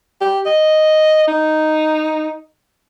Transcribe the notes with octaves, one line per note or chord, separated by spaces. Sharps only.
G4
D#5
D#4